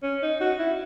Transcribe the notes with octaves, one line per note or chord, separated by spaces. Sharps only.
C#4
D#4
F#4
E4